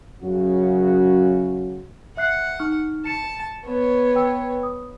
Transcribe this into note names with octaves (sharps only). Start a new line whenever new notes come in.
F#2 C#3 F#4
E5 F#5 F#6 C7
D#4 C#6 F6
A5 C#7 E7
B3 C#5
B4 G5 E6
D#6